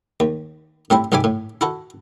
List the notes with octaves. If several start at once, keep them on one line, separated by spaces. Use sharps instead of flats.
D#2
A2 G3 C4 E4
C2 G#2 G3 E5 G#5 D6
A2
E4 F#4 A4